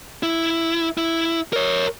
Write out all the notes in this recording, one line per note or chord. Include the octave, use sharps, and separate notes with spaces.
E4
E4
A#4 C#5